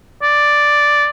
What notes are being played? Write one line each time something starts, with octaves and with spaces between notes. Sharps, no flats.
D5